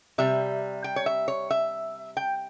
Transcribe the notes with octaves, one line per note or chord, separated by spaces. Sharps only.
C3 G3 E5
G5
C#5
E5
C#5
E5
G5